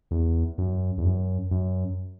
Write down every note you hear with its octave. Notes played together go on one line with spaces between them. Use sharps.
E2
F#2
E2
F#2
F#2